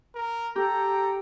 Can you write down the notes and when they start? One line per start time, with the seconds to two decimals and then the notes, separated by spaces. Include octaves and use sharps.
0.15 A#4
0.56 G4 A4 G5 A#5